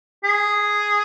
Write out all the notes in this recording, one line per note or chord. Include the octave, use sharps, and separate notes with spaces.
G#4